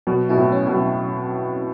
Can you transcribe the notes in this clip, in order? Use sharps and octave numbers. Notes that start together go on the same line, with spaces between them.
B2 F#3
B2 E4
A2
C#4
B2
F#3